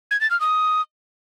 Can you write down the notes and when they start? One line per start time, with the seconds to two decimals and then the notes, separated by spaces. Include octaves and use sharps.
0.11 G#6
0.21 A6
0.31 F6
0.41 D#6